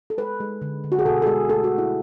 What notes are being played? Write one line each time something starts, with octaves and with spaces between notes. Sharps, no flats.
A4
G#3 B4
G#3
D3
D3
F#4
G#4
B2 A4
A4
G#3 G#4
A3 A4
F#4
A3
E4